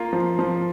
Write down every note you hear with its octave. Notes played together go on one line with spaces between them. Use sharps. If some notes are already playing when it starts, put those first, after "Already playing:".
Already playing: A#3 F4
F3
F3